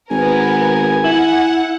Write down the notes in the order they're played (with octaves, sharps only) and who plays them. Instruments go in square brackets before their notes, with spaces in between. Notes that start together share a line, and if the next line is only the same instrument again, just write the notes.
[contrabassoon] G#1 [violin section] B3 A#4 [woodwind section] G#5
[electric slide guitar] E4 [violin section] F#5